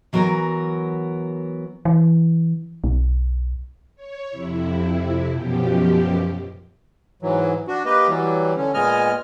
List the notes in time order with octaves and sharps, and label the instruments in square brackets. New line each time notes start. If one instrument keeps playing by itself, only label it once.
[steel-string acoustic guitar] E3 F#3 B3 A#4
[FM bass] E3
B1
[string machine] C#5
F2 C3 E4
F#2 B2 F3 G4
[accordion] G#2 E3 F#3
D4 F#4
A#3 G4 B4 D#5
E3 F#3 G3
D3 C#4
A#2 G#3 B3 D#5 G#5 F6